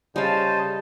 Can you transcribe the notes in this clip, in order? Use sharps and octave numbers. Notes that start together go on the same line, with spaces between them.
C#3 G3 C5 D#5 F5 A5